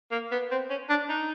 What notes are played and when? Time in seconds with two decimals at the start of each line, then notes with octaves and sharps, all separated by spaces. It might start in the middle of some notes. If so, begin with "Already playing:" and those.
0.11 A#3
0.32 B3
0.51 C4
0.70 C#4
0.89 D4
1.09 D#4